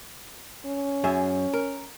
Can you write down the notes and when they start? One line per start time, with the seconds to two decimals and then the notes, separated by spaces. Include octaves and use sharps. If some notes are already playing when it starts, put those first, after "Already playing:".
0.66 C#4
1.04 F#2 G#4 E5
1.54 A#4